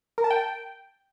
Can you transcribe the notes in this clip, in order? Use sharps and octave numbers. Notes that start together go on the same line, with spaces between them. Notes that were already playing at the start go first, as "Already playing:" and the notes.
A#4
A5
G5